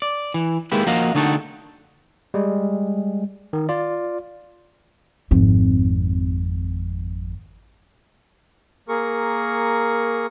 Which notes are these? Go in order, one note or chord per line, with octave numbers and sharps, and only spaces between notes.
D5
E3
D#3 G#3 A#3 E4 G4 B4
F3 A#3 F#4 D#5 F5
D3 A3 D#4 F#4 A4 G5
G3 G#3
D#3
F4 D5
G#1 F2
A#3 G#4 A#4 C#6